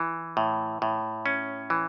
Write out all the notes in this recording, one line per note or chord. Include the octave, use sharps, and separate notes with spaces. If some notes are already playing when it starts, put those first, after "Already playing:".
Already playing: E3
A2
A2
C#4
E3